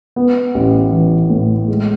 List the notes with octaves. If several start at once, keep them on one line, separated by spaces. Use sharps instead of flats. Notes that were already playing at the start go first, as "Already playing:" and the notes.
B3
A1
E3
A2
G#3